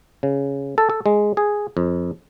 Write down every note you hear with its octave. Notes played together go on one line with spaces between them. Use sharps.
C#3
A4
A4
G#3
G#4
F2